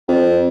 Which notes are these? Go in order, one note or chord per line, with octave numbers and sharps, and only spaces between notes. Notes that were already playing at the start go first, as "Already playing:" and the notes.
F2